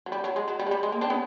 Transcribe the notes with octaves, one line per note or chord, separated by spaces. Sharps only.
F#3
G3
F#3
G#3
F#3
G3
G#3
G3
G#3
A#3
C4 D4
B3 C#4